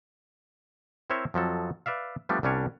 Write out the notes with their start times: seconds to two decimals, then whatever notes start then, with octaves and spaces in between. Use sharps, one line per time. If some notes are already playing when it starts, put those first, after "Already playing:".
1.10 C4 E4 A#4 C5 C#5 E5
1.34 F2 F3 F#3 A4
1.86 B4 D5 E5 F5
2.29 F3 G3 A3 B3 D4
2.43 C2 G3 C#4 D4 C#5